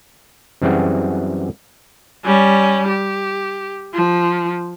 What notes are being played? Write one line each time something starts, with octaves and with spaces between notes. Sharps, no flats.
F#2 E3 G3 C4 F#4 G#4
G3 C#4
G4
F3